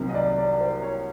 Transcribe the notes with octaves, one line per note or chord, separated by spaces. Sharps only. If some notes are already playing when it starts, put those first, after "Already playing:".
Already playing: C2 C3 D#3 F#3 A#3
D#5
D5
D5
C5
C#5